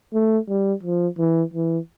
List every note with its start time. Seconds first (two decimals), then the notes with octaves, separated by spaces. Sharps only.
0.14 A3
0.49 G3
0.83 F3
1.18 E3
1.54 E3